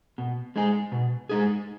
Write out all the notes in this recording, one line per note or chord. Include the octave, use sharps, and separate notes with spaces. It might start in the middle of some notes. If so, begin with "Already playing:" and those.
B2
G#3 D#4 G#4
B2
G#3 D#4 G#4